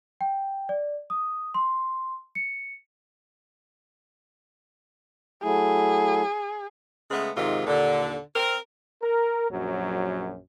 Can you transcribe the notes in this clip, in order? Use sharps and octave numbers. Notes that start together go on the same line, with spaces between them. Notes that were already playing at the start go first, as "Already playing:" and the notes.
G5
D5
D#6
C6
C#7
F#3 A3 E4 G#4
C#3 G#3 A3 B3
G#2 C3 D#3 G#3 F4
D#2 A#2 D3
C4 A#4
A#4
A#1 F#2 F#3